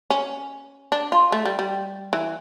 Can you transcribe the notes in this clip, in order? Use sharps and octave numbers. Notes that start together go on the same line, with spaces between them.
C#4
D4
F4
A3
G3
G3
E3